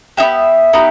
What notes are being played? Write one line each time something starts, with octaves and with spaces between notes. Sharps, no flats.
D#4 G4 E5
B3
B3 D#4 G4